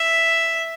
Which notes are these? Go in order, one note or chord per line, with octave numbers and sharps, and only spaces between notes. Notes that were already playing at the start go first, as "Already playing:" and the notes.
Already playing: E5